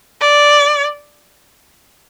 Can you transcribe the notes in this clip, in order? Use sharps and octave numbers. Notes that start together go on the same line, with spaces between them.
D5